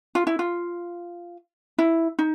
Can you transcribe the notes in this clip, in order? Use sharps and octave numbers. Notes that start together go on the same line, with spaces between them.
F4
E4
F4
E4
D#4